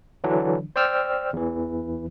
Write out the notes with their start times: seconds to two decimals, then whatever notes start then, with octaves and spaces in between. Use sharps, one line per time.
0.24 D3 E3 F#3 D4
0.76 C5 D5 G5 E6 F6
1.33 E2 E3